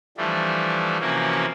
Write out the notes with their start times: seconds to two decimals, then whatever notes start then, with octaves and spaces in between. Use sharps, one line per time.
0.18 E3 F3 G3 A3 D4
1.00 C3 E3 F3 A#3 C#4 F#4